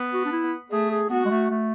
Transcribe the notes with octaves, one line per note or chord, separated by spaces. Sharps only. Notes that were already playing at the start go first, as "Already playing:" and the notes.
Already playing: B3
F#4
D4
E4
A3 G#4
G#4
B3 F#4
G#3
A3
A3